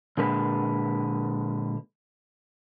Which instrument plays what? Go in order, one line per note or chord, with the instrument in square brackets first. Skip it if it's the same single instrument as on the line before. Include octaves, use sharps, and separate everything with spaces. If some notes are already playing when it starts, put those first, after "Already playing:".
[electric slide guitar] A#2 D3 G#3 B4